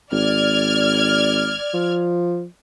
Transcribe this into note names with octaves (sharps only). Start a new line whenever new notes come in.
G#1 D5 F6 G#6
F3